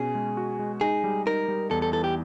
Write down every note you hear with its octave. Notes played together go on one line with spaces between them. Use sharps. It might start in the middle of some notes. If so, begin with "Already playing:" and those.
Already playing: B2 C#4 G#4
G#3
F#4
G#3
D#4 G#4
G3
D#4 A#4
G3
E2 A4
A4
E3 A4
G4